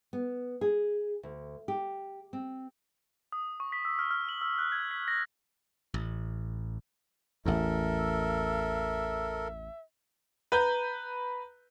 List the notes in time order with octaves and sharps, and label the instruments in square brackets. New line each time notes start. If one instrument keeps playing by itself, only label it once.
[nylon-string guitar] B3
G#4
D2
G4
C4
[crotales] D#6
C#6
B6
E6
F6
F6
F#7
E6
F#6
G#6
B6
A#6
[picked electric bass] A1
[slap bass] A1 E2 [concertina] A4 A#4 [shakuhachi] E5
[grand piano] B4 A#5 G6